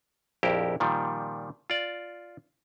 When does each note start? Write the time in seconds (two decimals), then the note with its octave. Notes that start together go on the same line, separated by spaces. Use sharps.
0.43 A#1 F2 E4 G4 A#4 C5
0.80 A#2 D#3 F3 G3
1.70 F4 D5